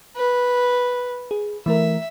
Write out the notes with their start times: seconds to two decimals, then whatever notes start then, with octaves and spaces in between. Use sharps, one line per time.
0.16 B4
1.31 G#4
1.66 E3 A3 A#4 E5